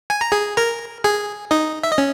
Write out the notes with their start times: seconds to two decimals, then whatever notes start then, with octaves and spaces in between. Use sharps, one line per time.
0.10 G#5
0.21 A#5
0.32 G#4 G#5
0.57 A#4 A#5
1.04 G#4 G#5
1.51 D#4 D#5
1.83 E5
1.91 D#5
1.98 C#4